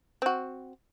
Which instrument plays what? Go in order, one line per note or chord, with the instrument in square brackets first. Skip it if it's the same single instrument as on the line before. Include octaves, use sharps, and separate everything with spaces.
[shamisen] C4 F#4